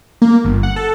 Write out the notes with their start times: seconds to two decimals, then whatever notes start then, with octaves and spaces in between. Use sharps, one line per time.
0.22 A#3
0.44 G1
0.63 F#5
0.76 A4